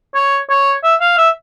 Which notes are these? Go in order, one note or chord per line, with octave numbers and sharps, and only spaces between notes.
C#5
C#5
E5
F5
E5